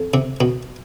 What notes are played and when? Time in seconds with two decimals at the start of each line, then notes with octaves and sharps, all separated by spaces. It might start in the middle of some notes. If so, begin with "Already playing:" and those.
Already playing: F2
0.14 C3
0.41 B2